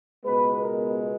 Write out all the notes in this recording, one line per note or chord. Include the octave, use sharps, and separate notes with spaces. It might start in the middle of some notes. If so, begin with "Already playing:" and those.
C#2 B2 G#3 B3 B4
A#4